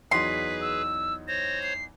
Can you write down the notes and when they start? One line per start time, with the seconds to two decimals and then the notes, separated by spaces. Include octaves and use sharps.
0.11 E2 F#3 D#4 G#4 B4 C6 B6
0.61 E6
1.28 C5 C#5 A#6
1.63 C7